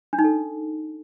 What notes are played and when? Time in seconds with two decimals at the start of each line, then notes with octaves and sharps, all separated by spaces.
0.13 D4
0.19 D#4
0.24 A4